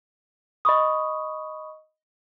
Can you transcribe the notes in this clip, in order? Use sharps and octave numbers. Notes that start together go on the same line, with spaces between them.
D#5 B5 C#6 D#6